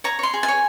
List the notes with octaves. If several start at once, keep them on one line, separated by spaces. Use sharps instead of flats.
C#5 A#5
C#5 C6
G#4
G#5
C#5